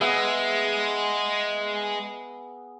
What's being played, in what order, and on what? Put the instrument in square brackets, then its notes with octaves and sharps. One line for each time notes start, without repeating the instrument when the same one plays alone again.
[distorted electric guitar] G#3 [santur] B3 G#4 E5